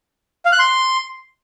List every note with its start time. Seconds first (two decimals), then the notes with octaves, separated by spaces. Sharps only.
0.46 F5
0.52 F#6
0.59 C6